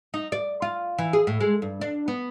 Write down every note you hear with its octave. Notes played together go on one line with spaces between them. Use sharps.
D#4
D5
F4
E3
G#4
A2
G#3
G2
D4
B3